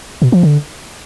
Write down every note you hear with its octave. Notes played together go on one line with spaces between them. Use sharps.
B2
F3
D3